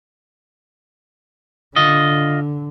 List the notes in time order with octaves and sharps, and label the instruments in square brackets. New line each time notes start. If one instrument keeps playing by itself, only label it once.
[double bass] D3 [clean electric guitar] F4 D#5